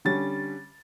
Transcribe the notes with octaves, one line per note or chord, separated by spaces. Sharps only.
D3 G3 C#4 A6